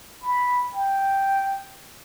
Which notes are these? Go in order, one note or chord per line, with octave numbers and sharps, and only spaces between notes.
B5
G5